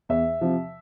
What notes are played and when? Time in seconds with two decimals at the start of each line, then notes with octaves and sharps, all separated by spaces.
0.09 E2 E5
0.41 C3 F3